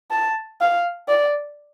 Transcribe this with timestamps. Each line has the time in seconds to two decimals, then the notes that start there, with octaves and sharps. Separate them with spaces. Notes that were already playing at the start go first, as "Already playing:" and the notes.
0.11 A5
0.61 F5
1.08 D5